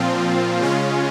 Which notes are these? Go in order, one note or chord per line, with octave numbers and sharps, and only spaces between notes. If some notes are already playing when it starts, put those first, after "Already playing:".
Already playing: A#2 F3 C4 F4
C#3 G#3 C#4 F4